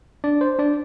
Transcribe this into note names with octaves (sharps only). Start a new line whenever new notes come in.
D4 D5
C5
D4 D5